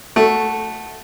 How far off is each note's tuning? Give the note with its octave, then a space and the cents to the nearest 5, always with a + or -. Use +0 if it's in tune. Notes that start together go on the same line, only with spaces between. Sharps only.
A3 +0 F#4 +0